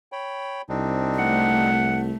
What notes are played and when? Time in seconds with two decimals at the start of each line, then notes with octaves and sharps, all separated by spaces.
0.12 C#5 G5 B5
0.69 C2 C4 D4 D#4
1.19 A3 F#5